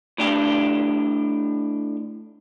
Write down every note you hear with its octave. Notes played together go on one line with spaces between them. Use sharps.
A2 D4 G4